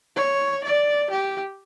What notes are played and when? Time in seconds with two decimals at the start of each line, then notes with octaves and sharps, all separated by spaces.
0.16 C#5
0.64 D5
1.11 G4